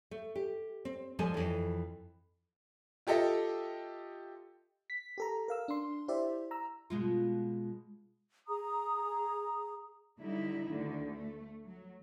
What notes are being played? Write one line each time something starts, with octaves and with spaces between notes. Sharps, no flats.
A3
G4
C4
F3 G3 G#3 A4 G#5 A5
F2 E3
F4 G4 A4 D#5 E5
B6
G4 A4 A#5
A#4 F5 E6
D4 C6
E4 G4 C5 D5 E5
A#5 E6
B2 G#3 F4
G#4 A#5 D#6
D3 F#3 G3 D#4 E4
D2 D3 D#3
A3
F#3